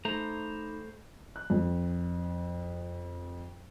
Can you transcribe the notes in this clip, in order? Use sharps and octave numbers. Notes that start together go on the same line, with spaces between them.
A3 D#4 C5 A#5 B5 D6
F#6
F2